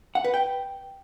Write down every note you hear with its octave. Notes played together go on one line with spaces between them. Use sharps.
F#5
B4
G5